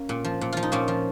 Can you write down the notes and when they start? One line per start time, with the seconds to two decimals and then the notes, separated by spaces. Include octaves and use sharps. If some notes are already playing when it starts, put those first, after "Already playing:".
Already playing: A#3 C#4
0.09 A#2
0.25 F3
0.41 A#2
0.52 F3 F4
0.63 D#4
0.72 A#2 A#3 C#4
0.88 F3